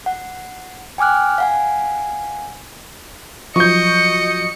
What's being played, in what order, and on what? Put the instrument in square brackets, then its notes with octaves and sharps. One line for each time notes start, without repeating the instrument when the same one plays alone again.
[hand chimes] F#5
G5 G#5 D6 F6 F#6
F5 F#5 G#5
[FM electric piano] F3 F#3 F#4 [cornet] D#5 [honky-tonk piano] C#6 G6 [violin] C#7